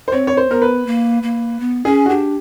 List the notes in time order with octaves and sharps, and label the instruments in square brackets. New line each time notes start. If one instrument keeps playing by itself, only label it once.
[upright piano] C5
[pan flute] C4 [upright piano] C#5
[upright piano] C#5
C5
[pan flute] B3 [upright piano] A#4
[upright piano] B4
[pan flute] A#3
A#3
B3
[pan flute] C#4 [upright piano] G#4
[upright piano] F#4
[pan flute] D4 [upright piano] G4